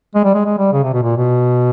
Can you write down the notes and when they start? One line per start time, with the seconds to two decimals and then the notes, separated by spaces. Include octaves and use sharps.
0.15 G#3
0.25 G3
0.35 G#3
0.45 G#3
0.58 G3
0.73 C#3
0.83 C3
0.93 B2
1.03 A#2
1.17 B2